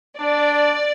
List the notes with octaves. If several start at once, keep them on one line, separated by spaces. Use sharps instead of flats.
D4 D5